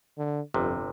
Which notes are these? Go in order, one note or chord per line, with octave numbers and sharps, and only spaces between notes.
D3
G1 F2 C3